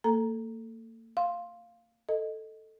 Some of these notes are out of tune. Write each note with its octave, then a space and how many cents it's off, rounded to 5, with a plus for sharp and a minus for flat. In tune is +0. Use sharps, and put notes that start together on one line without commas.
A#3 -40 A4 +0 A#5 +0
F5 +0 C6 +10
A4 +0 D#5 +0